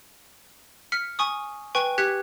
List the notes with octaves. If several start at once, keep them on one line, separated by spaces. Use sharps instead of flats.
F6 B6 C#7
G#5 C#6 D#6
B4 G5 G#5 C#6
G4 F#6 G#6 B6 C#7